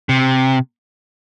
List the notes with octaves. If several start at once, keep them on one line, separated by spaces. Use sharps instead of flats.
C3